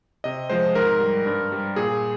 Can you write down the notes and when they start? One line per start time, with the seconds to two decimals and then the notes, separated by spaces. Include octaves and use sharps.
0.24 C3 D#5
0.50 F3 G#3 C5
0.75 G#2 A#4
1.00 G3
1.26 G2
1.52 G3
1.76 A#2 G#4